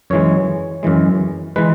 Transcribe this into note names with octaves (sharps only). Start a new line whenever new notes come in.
F#2 E3 G#3 C#5
F#2 E3 G#3
E3 G#3 B4